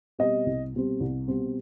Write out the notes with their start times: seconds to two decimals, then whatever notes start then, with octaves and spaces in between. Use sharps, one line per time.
0.19 B2 G3 C4 D#5
0.46 C2
0.73 B2 G3 C4
1.00 C2
1.28 B2 G3 C4